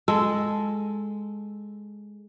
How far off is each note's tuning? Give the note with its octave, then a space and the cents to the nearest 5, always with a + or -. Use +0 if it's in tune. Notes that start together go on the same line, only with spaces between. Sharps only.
G#3 +0 A4 -5